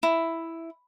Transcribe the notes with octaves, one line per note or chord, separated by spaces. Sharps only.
E4